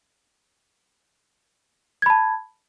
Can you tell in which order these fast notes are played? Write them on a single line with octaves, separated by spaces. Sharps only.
G#6 B5 A5